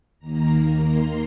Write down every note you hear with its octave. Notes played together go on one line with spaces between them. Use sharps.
D#2 D#3 A#3 A#5
C6